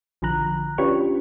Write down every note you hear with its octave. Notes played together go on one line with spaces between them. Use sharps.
A#1 D3 F3 A#5 F#6
C#4 D4 F4 G4 B4 C#6